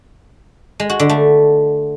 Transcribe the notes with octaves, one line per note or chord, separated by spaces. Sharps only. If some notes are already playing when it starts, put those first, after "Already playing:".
G#3
F#4
D3
A3